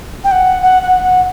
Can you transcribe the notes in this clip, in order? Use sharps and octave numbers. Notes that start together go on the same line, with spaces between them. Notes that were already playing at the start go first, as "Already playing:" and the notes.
G5
F#5
F#5
F#5
F#5